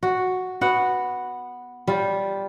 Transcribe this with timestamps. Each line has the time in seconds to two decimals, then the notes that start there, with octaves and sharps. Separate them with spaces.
0.03 F#4
0.61 B3 F#4 F#5
1.87 G3 F4 G4